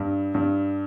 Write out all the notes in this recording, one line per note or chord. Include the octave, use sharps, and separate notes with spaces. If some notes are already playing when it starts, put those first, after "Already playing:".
Already playing: G2
G2